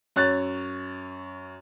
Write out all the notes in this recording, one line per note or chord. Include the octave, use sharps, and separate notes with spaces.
F#2 C#5 F#6 A6